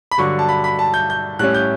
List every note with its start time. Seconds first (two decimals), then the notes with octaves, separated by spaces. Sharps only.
0.11 B5
0.18 G2 D3 F#3 C#6
0.39 A5
0.49 B5
0.64 B5
0.79 A5
0.94 G6
1.10 G6
1.39 A2 G3 C#4 F#6
1.54 G6